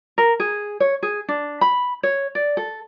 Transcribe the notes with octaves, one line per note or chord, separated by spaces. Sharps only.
A#4
G#4
C#5
G#4
D4
B5
C#5
D5
A4